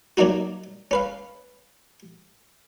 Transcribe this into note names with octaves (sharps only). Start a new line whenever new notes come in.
F#3 A#3 D4 D#4 F#4
C#4 B4 F5